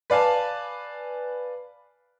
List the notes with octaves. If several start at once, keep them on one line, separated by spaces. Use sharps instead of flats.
B4 D5 F5 G#5 A5